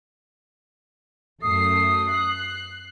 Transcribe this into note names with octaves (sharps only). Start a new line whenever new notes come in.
F#2 A3 D#6 C7
F#6 C7